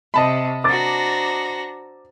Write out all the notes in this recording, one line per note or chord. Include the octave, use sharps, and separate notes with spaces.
C3 D#5 A5 B5
D4 F#4 C5 A#5 D6 A6